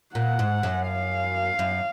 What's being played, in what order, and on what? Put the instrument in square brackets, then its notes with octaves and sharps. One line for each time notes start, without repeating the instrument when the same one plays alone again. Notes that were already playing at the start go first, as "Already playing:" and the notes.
[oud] A#2 [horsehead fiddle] F#5
[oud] G#2
F#2
[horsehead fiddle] F5
[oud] F#2